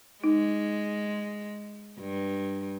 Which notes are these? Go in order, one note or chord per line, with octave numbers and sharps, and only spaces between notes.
G#3 D#4
G2